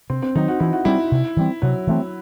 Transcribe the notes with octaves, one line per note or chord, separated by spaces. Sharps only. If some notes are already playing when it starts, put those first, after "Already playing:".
C3 C4
C4
D#3 F#3 D#4
F#4
E3 E4
F#4
G3 C4 E4
C3
E3 G3 C4
C3 F#3
E3 A3 C4